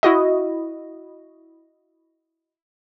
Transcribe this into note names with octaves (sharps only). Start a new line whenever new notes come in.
E4 F#4 D#5